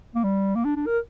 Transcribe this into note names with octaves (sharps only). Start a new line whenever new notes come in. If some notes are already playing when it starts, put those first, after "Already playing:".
A#3
G3
A#3
D4
D4
A#4